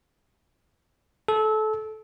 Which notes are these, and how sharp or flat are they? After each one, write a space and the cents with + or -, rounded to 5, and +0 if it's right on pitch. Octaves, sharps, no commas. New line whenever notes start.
A4 -25